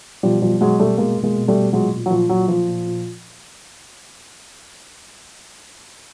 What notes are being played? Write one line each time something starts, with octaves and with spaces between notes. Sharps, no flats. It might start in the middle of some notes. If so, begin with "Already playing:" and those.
B2 F3 G3
B2 F3 G3
B2 F#3 G#3
B2 G3 A3
B2 G#3 A#3
B2
G#3 A#3
B2
G3 A3
B2
A#2 F#3 G#3
A#2
F#3
A#2 F3
A#2 F#3
A#2 F3
A#2
A#2